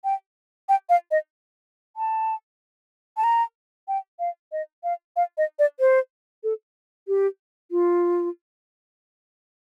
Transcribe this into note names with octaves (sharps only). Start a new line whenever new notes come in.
G5
G5
F5
D#5
A5
A5
A#5
G5
F5
D#5
F5
F5
D#5
D5
C5
A4
G4
F4